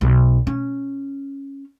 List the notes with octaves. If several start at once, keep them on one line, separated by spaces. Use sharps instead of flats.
B1
C#4